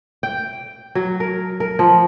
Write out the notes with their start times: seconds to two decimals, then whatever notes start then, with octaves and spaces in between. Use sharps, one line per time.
0.23 G5
0.95 F#3
1.20 A#4
1.60 A#4
1.79 F3